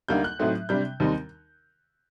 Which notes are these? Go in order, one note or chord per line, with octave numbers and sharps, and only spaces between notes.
D2 D3 G3 A#3 D#4 G6
F#6
A2 F#3 A3 C4 D#4
C3 G3 D4 G6
D#2 D#3 G3 C4 D#4